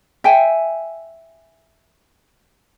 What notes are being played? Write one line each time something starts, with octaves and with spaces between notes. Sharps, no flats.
E5 G5 G#5